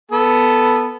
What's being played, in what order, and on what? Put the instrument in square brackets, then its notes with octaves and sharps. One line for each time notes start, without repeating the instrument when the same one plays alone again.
[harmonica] B3 A4